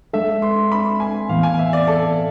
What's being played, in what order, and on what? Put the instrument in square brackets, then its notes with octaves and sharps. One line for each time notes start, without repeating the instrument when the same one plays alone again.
[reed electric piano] G#3 D4 A4 [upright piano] E5
[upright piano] C6
B5
G#5
[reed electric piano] A2 E3 B3 [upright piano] F5
[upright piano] G#5
E5
D5
A4